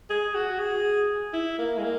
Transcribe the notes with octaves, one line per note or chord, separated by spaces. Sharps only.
G#4
F#4
G#4
E4
A#3
G#3
A#3